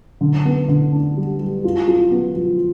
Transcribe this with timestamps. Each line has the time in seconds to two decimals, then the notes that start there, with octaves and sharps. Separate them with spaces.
0.21 D3
0.45 B3
0.68 D3
0.92 D4
1.17 G3
1.40 G3
1.64 F4
1.88 F4
2.11 B3
2.36 F3